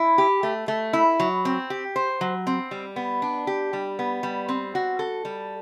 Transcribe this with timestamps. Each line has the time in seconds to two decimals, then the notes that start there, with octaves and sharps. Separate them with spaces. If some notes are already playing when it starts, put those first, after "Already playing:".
Already playing: E4
0.18 G4
0.43 A3
0.68 A3
0.93 E4
1.20 F#3
1.45 C4
1.70 G4
1.96 C5
2.21 F#3
2.47 C4
2.71 G3
2.96 B3
3.22 D4
3.47 G4
3.73 G3
3.99 B3
4.23 G3
4.49 C4
4.75 F#4
4.99 A4
5.25 G3